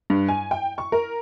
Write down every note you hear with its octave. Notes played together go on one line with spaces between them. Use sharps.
G2
G#5
G5
C#6
A#4